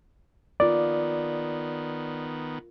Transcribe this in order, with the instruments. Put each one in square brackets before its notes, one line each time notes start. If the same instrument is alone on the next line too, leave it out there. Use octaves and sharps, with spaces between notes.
[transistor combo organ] D#3 B3 [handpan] F4 A#4 [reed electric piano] D5